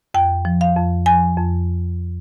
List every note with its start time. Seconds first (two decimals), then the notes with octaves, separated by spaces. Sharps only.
0.14 F2 G5
0.45 F3
0.61 F5
0.76 F2
1.06 F3 G#5
1.37 F2